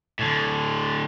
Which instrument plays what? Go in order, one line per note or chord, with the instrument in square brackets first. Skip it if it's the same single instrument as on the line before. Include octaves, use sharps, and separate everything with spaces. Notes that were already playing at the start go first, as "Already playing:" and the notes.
[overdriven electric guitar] A2 D3